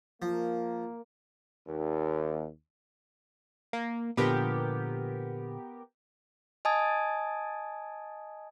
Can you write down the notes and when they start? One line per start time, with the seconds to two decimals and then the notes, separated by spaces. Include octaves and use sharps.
0.22 F3 A#3
1.67 D#2
3.73 A#3
4.17 A#2 D3 F3 B3 G4 A#4
6.65 D#5 G#5 A5 D#6 G#6